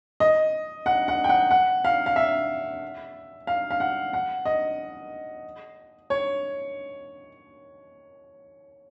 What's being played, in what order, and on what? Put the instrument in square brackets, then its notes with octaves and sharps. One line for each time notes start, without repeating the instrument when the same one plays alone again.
[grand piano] D#5
F#5
F#5
G5
F#5
F#5
F5
F5
E5
F5
F5
F#5
F#5
D#5
C#5